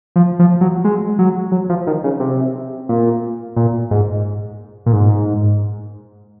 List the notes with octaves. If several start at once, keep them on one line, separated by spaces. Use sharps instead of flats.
F3
F3
F#3
G#3
F#3
F#3
F3
D#3
C#3
C3
A#2
A#2
G#2
A#2
G#2